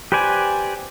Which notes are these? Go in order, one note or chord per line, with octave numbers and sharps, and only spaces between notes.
G4 B4 C5 D5 G#5